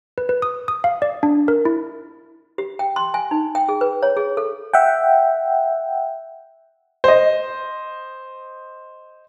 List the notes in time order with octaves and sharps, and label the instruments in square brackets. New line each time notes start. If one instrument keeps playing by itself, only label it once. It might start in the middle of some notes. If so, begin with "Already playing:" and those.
[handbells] B4
B4
D#6
D#6
F5
D5
D4
A#4
E4
[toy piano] G4
G5
C6
G#5
D#4
G5
G#4
B4
C#5
G#4
A4
[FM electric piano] E5 F#5 G5
[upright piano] C5 D#5